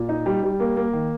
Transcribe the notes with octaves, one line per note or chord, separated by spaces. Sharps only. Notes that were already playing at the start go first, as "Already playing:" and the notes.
Already playing: A#2
D#4
G3
G3
A#3
A#3
D#3